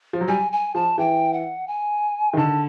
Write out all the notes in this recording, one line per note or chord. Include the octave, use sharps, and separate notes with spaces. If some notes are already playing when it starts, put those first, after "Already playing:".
F3
F#3
G3 G#5
G#5
F3 A5
E3 G5
F#5
G#5
D#3
D3 A5